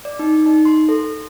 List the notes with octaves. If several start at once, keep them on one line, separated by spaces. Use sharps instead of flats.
D5
D#4
D#4
C6
A4